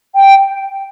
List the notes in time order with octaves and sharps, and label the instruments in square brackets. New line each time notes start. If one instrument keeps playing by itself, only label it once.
[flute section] G5